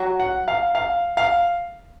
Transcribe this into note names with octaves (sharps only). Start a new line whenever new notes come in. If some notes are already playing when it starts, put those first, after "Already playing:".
Already playing: F#3
F#5
F5
F5
F5